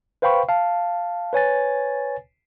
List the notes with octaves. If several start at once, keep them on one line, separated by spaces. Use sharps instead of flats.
B4 C5 F5 G5 B5 C#6
F5 A5
B4 C#5 G#5 A6